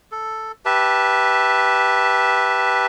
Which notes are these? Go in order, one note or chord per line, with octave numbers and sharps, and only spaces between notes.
A4
G4 B4 E5 A5